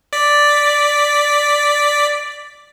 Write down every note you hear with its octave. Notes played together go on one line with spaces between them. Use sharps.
D5 B6